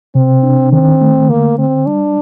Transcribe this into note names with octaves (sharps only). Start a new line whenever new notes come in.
C3 C4
D4
D#3 C4
A3
D3 A#3
D3 C4
G3 D4